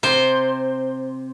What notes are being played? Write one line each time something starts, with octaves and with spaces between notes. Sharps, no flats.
C3 C5